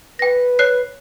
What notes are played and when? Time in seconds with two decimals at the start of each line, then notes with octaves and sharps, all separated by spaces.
0.19 B4 G5 A#6
0.59 C#5 F#6 C7